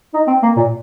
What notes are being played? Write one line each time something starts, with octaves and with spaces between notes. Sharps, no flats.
D#4
C4
A#3
A#2